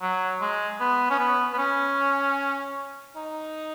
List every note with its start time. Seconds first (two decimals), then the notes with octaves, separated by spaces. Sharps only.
0.02 F#3
0.41 G#3
0.80 B3
1.10 C#4
1.19 B3
1.53 B3
1.58 C#4
3.16 D#4